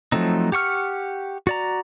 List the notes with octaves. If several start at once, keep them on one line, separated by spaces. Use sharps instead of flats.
F3 F#3 A3 C4 D#4
G4 F#5 C#6 F6
F#4 D5 A#5